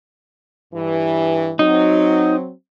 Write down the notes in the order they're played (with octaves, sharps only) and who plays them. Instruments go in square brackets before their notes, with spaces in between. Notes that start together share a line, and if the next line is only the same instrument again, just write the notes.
[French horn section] G2 E3
[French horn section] F#3 C4 [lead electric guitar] D#4